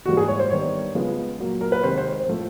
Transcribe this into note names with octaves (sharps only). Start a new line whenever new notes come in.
G#2 E3 G3 A#3 F#4
G#4
C#5
C5
G2 D#3 G3 B3 C#5
C#3 F3 G#3 B3
A#2 F#3 A#3
A#4
B4
C3 D#3 G#3 C5
C5
C5
A2 F3 A3